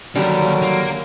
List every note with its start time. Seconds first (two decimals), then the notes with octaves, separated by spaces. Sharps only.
0.15 D#2 D3 F#3 G3 A#4
0.62 A#3